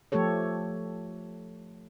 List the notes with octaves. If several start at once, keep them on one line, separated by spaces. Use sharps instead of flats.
F3 A3 G4 A4 C#5